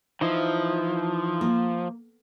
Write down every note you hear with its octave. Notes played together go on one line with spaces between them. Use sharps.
E3 F3 D#4 E4
A#3